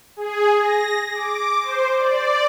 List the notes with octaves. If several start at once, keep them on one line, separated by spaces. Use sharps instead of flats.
G#4
A#6
D6
C5
D5